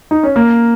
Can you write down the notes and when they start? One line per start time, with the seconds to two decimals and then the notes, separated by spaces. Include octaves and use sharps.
0.11 D#4
0.23 C#4
0.36 A#3